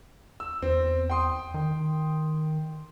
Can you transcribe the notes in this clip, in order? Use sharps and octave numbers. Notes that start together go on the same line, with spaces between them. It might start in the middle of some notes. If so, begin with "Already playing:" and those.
E6
E2 C4
G5 C6 D#6
D#3